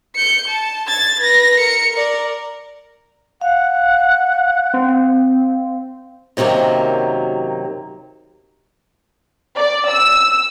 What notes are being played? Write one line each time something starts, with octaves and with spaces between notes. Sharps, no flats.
G6 C#7
A5
G#6 A6
B4 A#6
A#4 C#7
A#4 D5
F5 F#5
C4
F#2 C3 D#3 F#3 A#3
D5
E6